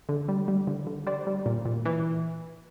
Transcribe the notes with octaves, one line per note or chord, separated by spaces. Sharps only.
D3
G3
G3
D3
D3
G3 C5 D5
G3
A#2
A#2
E3